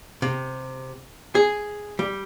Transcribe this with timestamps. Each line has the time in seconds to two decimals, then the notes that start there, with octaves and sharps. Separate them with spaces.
0.22 C3
1.35 G#4
1.99 G3